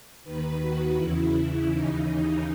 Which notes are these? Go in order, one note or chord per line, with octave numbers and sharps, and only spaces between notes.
D#2 D#3 B4
F#4
E2 C#3 E3 E4
D#2 C#3 E3 D#4